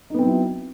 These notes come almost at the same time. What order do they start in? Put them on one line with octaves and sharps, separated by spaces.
D#4 B3 C4 F#3 E4